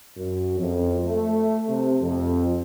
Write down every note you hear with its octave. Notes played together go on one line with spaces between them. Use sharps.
F#2
F2
A3
C3
F2